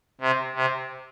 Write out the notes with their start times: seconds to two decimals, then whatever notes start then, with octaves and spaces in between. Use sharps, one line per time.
0.21 C3
0.56 C3